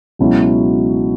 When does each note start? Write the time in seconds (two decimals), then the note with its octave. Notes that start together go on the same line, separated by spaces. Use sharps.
0.19 C#2 B2 F#3 C#4 E4